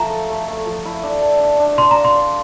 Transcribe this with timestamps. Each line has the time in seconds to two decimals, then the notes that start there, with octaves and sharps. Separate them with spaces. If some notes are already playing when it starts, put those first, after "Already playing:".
Already playing: F3 A3 A#5
0.10 A4
0.30 A3
0.48 A3
0.66 F3
0.85 E4
1.03 D4
1.22 A4
1.40 D4
1.59 D4
1.78 D5 C6
1.91 F5 A#5
2.05 C6
2.15 D5